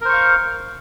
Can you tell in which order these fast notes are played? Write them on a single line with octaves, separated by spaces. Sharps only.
A#4 C5 C#6 F5